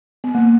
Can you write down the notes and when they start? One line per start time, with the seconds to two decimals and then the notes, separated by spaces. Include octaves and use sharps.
0.24 B3
0.35 A#3